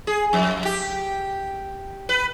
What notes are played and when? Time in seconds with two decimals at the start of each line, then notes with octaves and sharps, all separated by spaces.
0.07 G#4
0.33 F2
0.65 G4
2.09 B4